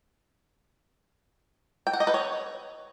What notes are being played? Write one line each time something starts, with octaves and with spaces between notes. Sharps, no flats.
G5
F#5
D#5
B4
C#5